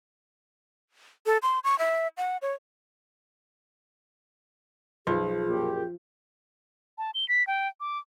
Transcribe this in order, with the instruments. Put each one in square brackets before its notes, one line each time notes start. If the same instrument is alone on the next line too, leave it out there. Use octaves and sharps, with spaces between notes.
[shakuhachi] A4
C6
C#6
E5
F#5
C#5
[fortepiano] B1 [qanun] F3 [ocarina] G#4
[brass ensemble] F#2 A#2 G4
[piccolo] A5
G7
B6
G5
D6